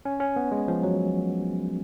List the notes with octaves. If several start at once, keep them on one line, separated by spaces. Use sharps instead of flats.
C#4
C#4
B3
G#3
F3
F#3